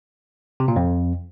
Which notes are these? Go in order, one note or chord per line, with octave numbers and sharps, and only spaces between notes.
C3
A#2
F2